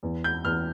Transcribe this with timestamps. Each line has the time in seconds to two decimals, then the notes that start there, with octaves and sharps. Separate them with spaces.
0.03 E2
0.24 G6
0.45 E2 F6